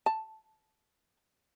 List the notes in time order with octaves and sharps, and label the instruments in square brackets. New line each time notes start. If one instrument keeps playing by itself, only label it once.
[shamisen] A5